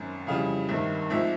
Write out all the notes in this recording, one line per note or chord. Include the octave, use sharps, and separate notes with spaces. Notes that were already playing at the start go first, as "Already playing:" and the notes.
Already playing: G#1 F#2
F2 C#3 E3 G3 F5
G#1 G2 D#3 E5
G#1 G#2 F3 E5